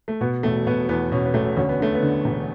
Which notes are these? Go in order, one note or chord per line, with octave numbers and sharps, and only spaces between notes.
A3
B2 B3
E1 A3
B2 B3
E2 B3
B2 C#4
B3
E1 A3
D2 C#4
B3
D3 A3
B3
D3
E1